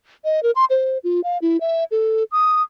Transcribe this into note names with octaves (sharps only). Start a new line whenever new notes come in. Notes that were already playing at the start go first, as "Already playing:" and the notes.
D#5
A#4
C6
C5
F4
F5
E4
E5
A4
D#6